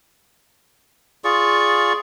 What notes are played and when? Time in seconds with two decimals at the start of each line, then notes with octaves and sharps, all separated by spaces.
1.24 F4 G#4 D5 C#6